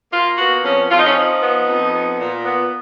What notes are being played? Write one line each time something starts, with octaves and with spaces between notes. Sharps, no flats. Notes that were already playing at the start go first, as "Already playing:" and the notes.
A#3 F4
B3 F#4
F2 C#4
F2 F4
D#4
C#4
F3 D#4
B3
F2
B3
A#2
B3